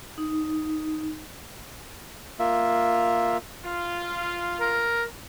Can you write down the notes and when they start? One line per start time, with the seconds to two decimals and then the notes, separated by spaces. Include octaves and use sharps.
0.18 D#4
2.39 A#3 F4 E5
3.64 F4
4.60 A#4